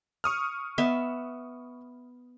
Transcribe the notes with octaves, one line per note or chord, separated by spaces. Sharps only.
C#6 D#6 F6
B3 E5